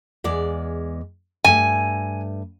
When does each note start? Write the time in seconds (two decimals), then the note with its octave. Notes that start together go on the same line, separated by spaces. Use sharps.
0.24 E2 G#3 D5
1.44 G2 A3 G#5